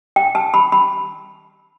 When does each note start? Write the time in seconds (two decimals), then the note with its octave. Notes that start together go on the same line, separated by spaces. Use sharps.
0.16 G5
0.35 A5
0.54 B5
0.72 B5